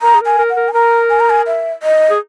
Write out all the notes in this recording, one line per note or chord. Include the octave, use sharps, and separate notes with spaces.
A#4 A#5
G#4
A#4 G#5
A#4
F#5
A#4
G#5
A#4 A#5
G#5
A#5
G#5
E5
D#5
G#4